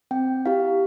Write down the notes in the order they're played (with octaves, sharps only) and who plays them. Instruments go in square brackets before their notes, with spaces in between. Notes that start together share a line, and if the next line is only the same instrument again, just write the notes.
[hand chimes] C4 G5
E4 G4 F5